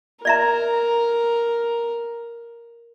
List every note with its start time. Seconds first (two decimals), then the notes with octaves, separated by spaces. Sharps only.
0.25 A#4 D5 E5 A#5